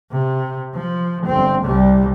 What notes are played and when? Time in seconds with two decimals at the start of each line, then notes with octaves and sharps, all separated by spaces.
0.11 C3
0.75 F3
1.26 G1 C4
1.65 C2 G3